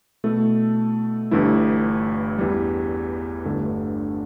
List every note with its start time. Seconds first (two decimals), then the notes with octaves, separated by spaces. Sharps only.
0.24 B2 A3 E4 A4
1.31 G1 G2 E3 A3 E4
2.38 E2 E3 G3
3.45 G1 G2 D3 A3